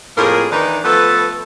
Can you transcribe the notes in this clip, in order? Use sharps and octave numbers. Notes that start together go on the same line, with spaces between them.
F2 A2 A#3 F4 G#4 A#4
D#3 E3 D4 D#4 B4
F3 A3 B3 A4 B4